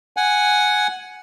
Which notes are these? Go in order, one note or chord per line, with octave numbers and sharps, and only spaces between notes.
F#5 G#5